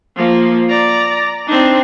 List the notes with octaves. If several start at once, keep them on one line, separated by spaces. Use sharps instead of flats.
F3 A#3
D5 A#5
C4 D4 D#4